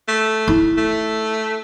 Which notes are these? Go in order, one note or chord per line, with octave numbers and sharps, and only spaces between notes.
A3
E4
A3